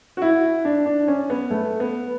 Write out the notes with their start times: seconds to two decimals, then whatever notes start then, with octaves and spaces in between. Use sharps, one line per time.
0.17 F#4
0.22 E4
0.65 D4
0.86 D4
1.08 C#4
1.30 B3
1.50 A3
1.80 B3